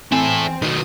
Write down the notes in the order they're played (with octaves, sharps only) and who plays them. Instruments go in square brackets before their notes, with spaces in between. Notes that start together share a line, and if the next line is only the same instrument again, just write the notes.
[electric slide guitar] E2 G#5 [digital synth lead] C4 [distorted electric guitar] E4 A4
[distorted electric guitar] D#3 F#3 [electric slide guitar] A3 D#4 B4 [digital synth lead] D#6